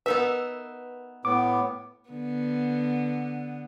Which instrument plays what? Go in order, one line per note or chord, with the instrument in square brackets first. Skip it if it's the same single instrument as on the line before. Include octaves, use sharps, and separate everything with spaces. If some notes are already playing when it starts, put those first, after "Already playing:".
[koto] B3 D#4 E5 [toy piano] A#4 B4
[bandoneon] A2 B3 [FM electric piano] D6
[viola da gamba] D3 B3